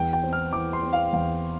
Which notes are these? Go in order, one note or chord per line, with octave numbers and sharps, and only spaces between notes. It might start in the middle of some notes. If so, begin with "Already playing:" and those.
Already playing: E2 G5
G5
C4
F6
E3 D6
C6
C4
F5
E2 F5